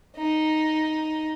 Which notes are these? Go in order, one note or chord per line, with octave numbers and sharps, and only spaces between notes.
D#4